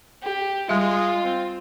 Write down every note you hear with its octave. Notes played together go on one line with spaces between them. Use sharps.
G4
G3 G#3 F4 E5
C4